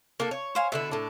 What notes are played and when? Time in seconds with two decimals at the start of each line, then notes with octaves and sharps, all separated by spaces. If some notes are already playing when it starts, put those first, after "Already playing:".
0.20 A#3 D4 A4
0.31 C#5
0.55 C5 F5 G#5
0.72 B2 D3 E4 E5
0.91 A2 D4